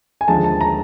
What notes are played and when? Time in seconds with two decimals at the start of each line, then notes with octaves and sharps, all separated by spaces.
0.21 G#5
0.28 D#2 D3 F3 G#3 A5
0.44 A5
0.61 A#5